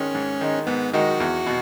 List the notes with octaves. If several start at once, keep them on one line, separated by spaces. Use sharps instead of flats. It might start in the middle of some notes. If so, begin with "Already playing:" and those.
Already playing: G#2 D#3 G#3 C#4 D#4
G#2
D#3 G#3 D#4
G#2 B3
D#3 G#3 D#4 F#4
E2
B2